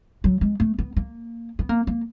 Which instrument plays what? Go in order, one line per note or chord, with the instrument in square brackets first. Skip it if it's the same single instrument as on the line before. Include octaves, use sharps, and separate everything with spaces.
[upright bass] F#3
G#3
A3
B3
A#3
B3
A#3
A#3